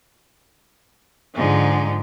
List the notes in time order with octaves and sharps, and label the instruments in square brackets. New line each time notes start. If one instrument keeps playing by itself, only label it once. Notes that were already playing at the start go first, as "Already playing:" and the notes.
[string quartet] G#2 D3 F3 G#3 D#4